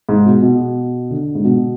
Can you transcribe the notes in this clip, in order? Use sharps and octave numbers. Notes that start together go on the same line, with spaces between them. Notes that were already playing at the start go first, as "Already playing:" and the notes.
G#2
B2
B2
D3
G#2
B2